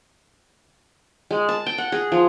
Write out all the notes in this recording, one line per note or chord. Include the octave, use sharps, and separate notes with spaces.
G#3
A5
G5
F#5
G#4
F3